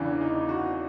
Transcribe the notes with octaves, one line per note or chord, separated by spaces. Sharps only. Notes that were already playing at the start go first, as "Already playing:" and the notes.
Already playing: E2 C#3 E3 D4
D#4
F#4